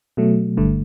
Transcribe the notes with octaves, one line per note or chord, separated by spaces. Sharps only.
B2 F#3 A3
G1 G2 D3 A3